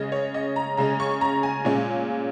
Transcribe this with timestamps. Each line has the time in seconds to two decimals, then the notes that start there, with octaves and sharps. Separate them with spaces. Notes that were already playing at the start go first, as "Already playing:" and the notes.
Already playing: C#3 G#3 C#4 D#5
0.12 C#5
0.34 D#5
0.56 A#5
0.77 C#3 G#3 C#4 A#5
1.00 C#6
1.21 A#5
1.43 G#5
1.65 A#2 G#3 C#4